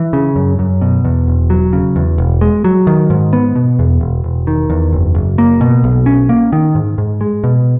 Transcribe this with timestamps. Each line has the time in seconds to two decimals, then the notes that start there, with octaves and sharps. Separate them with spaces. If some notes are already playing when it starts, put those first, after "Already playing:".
Already playing: E3
0.13 C#3
0.36 F#2
0.59 F#2
0.81 B2
1.05 E2
1.28 E1
1.50 F#3
1.73 C#3
1.96 E2
2.18 E1
2.41 G#3
2.64 F#3
2.87 D#3
3.10 G#2
3.33 B3
3.56 B2
3.79 E2
4.01 E1
4.24 E1
4.47 D#3
4.70 E2
4.93 F#1
5.15 F#1
5.38 A#3
5.61 B2
5.84 B1
6.06 C#4
6.29 A#3
6.53 D#3
6.75 G#2
6.98 G#2
7.21 G#3
7.44 B2